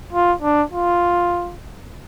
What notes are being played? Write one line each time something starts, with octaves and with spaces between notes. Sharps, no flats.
F4
D4
F4